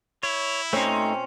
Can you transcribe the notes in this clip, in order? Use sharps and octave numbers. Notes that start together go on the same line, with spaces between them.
E4 C#5
A#2 A3 C4 C#4 D#4